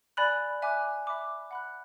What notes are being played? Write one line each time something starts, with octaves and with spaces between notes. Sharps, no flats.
D5 G#5 B5 F#6
E5 G#5 D6 F#6
E5 B5 D6 F#6
F#5 B5 F#6